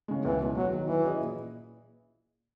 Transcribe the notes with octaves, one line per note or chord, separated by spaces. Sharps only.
C#3 G#3
C#2 E3
B2 F#3
E2 F#3
D#3 F#3
E3 F#3
C#4 G#4 D#5
A#2